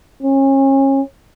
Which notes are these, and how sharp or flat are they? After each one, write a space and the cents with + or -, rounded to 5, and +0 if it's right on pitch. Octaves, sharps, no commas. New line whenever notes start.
C#4 -30